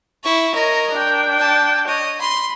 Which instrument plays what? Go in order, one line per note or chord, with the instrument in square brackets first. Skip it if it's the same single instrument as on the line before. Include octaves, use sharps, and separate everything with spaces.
[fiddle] E4 C#6
[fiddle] A#4 [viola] C#5 D#5
[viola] D4 G5
[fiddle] A5
[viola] C#5 [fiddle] D#5
[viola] B5 [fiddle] C6